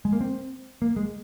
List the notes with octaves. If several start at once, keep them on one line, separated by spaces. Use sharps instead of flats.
G#3
A#3
C4
A#3
G#3